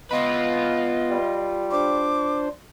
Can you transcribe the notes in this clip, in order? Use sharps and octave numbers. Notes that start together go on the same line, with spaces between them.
B3 F4 B4 D#5
G3
D4 C5 D6